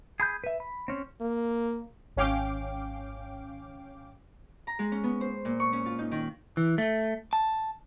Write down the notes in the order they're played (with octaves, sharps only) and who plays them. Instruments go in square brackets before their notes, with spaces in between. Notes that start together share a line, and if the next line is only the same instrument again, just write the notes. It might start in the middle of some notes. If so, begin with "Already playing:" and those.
[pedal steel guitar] G#4 B5 G6
B4 E5
B5
C4 C#4
[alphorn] A#3
[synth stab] G#1 C#4 F5 G5 D6
[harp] A#5
G#3
C#4
B3
C5
A#2
C#6
C#4
F4
D#4
D#3
[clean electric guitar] E3
A3
A5